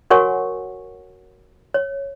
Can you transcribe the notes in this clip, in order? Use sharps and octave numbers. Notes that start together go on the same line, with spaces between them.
F#4 A#4 C#5 F#5 G#5 C#6
C#5